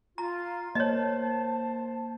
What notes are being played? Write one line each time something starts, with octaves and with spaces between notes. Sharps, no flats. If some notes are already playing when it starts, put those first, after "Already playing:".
F4 A#5
A#3 C5 C#5 D#5 A5